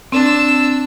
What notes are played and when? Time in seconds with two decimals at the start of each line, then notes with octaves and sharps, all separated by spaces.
0.12 C4 D4 E6